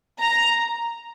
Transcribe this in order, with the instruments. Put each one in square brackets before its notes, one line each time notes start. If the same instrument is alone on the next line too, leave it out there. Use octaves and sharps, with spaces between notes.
[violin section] A#5